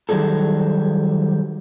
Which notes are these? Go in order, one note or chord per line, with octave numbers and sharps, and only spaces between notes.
D#3 F#3 G3 G#4 A4